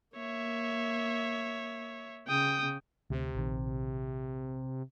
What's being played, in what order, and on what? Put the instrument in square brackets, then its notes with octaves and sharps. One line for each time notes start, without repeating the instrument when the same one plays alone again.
[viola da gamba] A#3 [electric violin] C#5 E5
[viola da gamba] C#3 [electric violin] G5 D#6
[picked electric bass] D2 [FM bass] C3
[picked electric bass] A#1 D#3